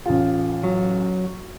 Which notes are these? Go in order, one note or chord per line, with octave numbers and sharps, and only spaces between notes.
A1 F4
F#3